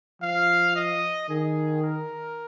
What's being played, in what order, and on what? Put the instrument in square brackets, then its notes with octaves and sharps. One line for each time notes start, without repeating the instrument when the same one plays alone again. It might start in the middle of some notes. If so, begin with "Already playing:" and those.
[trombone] F3 [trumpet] F5
[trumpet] D#5
[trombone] D#3 [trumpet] G#4
[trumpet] A#4